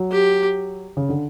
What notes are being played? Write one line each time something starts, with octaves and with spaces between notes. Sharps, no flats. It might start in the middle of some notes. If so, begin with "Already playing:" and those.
Already playing: F#3
G4
C#3
D3